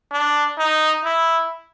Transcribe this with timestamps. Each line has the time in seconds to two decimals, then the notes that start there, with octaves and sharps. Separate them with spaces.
0.12 D4
0.58 D#4
1.05 E4